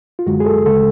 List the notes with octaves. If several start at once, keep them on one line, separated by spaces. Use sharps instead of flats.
F4
F#2 D3 G#3 F#4
G#4
A4
D2 C#3 G#3 A4